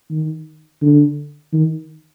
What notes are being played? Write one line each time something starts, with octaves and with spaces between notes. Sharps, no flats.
D#3
D3
D#3